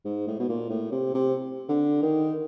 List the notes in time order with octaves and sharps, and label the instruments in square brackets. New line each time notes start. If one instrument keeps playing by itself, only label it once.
[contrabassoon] G#2
A2
B2
A#2
A2
C3
C3
D3
D#3